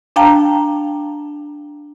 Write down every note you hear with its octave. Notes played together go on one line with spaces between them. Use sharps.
D4 F5 G5 A5 A#5